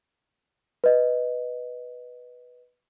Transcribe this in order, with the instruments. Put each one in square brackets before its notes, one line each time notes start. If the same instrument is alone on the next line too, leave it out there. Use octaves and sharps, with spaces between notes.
[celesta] B4 D#5